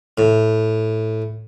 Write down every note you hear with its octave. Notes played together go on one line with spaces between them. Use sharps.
A2